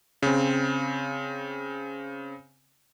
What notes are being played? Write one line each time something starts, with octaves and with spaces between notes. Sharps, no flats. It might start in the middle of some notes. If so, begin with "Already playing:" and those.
C#3 C4